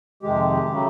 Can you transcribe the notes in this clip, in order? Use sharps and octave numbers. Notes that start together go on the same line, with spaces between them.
F2 C3 D#3 G#3 G4
C#3 F#3 A3